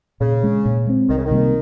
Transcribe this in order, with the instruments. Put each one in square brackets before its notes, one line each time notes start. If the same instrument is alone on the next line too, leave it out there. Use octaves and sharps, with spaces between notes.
[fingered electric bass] A#2 [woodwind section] C#3
[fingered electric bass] G#3 C#4
A#2
G#3 C4
[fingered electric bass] C2 [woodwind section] D#3
[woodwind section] C#3
D#3
[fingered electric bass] C3 G3 A#3